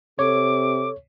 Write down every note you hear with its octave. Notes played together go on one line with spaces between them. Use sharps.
C3 A4 C#5 D6